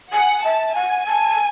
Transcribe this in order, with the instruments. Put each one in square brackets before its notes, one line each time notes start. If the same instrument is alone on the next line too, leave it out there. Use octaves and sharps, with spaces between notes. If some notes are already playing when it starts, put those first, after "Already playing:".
[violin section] F#5 [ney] G#5
[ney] E5 [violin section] A5
[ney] F#5 [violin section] G#5
[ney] A5